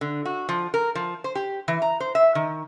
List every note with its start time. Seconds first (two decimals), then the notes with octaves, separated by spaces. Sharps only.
0.01 D3
0.25 F#4
0.49 F3
0.74 A#4
0.95 F3
1.24 C5
1.35 G4
1.68 E3
1.82 A#5
2.00 C5
2.15 E5
2.35 D#3